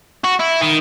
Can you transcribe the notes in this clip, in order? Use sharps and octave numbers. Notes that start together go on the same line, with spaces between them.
F#4
E4
D#3